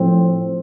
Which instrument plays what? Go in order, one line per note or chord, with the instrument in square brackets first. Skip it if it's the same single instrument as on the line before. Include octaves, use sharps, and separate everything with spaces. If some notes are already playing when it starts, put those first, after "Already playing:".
Already playing: [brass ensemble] A2 F3 C4